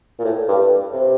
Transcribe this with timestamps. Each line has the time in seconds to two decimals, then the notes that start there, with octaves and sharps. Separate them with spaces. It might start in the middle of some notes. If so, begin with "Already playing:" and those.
0.19 A#2
0.25 A2
0.48 G2
0.94 C3